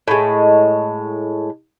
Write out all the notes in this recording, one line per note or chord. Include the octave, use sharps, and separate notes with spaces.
A2 G#3